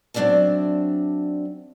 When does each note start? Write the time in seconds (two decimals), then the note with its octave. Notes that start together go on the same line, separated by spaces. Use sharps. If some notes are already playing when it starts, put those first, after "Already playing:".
0.14 F#3 C4 D4 D5 E5 A5